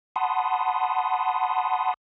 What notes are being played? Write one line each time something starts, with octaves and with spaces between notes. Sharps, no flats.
F#5 A5 B5 C6 D#6